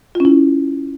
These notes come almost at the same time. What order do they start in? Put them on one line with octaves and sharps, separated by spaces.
F4 C#4 E4